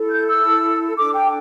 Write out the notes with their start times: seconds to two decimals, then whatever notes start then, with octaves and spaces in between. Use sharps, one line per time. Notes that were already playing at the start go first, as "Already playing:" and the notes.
Already playing: E4 A4
0.10 G6
0.27 E6
0.97 D4 A4 D6
1.15 G5